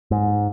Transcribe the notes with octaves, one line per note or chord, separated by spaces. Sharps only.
G#2